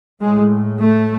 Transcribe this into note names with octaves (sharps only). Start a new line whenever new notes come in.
A2 G#3
A3